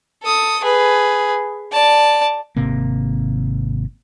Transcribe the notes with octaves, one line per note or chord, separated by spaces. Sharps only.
A4 D#6
G#4 B4
D5 A5
G#1 C3 A#3